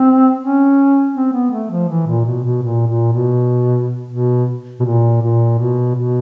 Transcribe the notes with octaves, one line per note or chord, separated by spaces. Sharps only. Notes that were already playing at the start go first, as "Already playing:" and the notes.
Already playing: C4
C#4
C4
B3
A3
F3
E3
A#2
B2
B2
A#2
A#2
B2
B2
B2
A#2
A#2
B2
B2